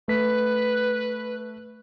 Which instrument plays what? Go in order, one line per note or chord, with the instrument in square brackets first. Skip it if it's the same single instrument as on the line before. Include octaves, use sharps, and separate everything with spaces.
[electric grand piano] A3 B6 [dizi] B4